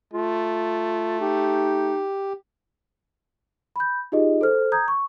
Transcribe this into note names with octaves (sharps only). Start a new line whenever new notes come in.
A3 F4
D#4 G4
B5 G6
D#4 F4 G4 G#4 D#5
A4 C5 F6
A#5 D#6 G6 G#6
C#6